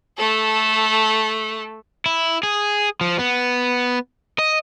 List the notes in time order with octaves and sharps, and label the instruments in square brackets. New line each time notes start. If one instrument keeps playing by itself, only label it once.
[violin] A3 A4
[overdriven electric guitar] E4
G#4
F3
B3
D#5